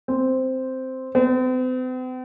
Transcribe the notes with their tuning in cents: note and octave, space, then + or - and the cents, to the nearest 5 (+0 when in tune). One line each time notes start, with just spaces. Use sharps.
C4 -5
C4 -45